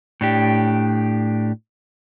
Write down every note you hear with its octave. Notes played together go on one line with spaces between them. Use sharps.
A2 D4 G4